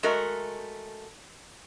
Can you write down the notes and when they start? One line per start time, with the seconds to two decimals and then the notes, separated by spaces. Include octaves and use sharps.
0.03 G#3 A3 F#4 A#4